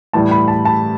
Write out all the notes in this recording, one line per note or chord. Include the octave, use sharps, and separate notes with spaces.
A2 E3 G3 A5
B5
A5
A5